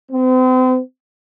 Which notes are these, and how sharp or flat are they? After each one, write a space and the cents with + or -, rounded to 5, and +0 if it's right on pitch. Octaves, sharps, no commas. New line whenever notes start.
C4 -40